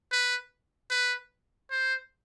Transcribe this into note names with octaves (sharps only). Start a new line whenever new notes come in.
B4
B4
C5